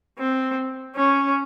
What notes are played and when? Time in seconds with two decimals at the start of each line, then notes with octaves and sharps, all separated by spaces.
0.19 C4
0.96 C#4